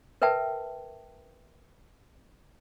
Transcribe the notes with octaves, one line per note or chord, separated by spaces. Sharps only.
A#4 B4 E5 G5 A5